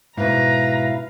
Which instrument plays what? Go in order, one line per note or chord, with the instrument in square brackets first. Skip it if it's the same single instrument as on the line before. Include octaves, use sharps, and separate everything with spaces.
[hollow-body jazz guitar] G#2 B2 [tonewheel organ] E4 F5 [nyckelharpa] B4 [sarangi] A#5